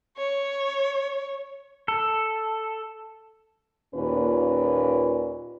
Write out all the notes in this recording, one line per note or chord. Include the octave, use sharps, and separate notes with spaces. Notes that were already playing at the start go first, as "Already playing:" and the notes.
C#5
A4
D#2 A#2 C#4 F4 B4